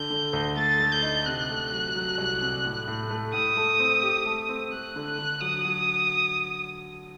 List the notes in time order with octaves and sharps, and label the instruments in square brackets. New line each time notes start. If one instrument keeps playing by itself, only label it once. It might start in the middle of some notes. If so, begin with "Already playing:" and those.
Already playing: [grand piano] D3 [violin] G6
[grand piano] D3
D2
[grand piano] A3 [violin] A6
[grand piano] A3
[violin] G6
[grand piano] D#4
[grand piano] C3 [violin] F#6
[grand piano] A3
F#3
F#3
C2
C3
A2
A2
A3
[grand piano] A2 [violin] D#6
[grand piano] A3
C4
G4
A3
C4
[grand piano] A3 [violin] F#6
[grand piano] D3
[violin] F#6
[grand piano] D3
[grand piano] F#3 [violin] D#6
[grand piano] F#3